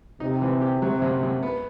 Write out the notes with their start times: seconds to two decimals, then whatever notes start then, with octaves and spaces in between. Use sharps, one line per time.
0.20 C3 D#4
0.42 E3
0.62 G4
0.82 C3 F#3
1.02 F#2
1.23 F#2
1.43 B3